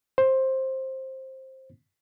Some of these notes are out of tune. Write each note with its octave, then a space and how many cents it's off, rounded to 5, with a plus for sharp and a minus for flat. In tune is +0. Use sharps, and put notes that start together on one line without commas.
C5 +15